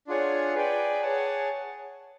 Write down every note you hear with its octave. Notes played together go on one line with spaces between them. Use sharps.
D4 F4 G#4 C#5 F#5
G#4 B4 D5 G5
G#4 C#5 F#5 A5